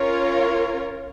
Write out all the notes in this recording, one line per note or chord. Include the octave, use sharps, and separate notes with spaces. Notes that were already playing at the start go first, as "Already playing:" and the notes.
Already playing: C#4 F4 A#4 C#5